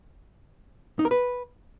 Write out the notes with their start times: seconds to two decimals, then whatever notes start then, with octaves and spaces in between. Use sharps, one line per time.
0.99 D#4
1.05 A#4
1.11 B4